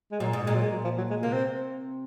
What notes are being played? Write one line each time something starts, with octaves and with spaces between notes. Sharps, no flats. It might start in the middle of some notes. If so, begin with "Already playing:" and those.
G#3
A#2 F#3
G#2
A#2 G#3
F#3
G#3
F#3
F3
F#3
G#3
C3 A#3
C4